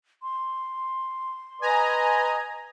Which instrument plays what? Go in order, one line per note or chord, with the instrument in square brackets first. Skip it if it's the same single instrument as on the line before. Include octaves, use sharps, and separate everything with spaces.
[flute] C6
[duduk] B4 [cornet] D#5 [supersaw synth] G#5 A#5